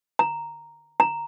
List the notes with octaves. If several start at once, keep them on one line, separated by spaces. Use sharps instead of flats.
A#5
A#5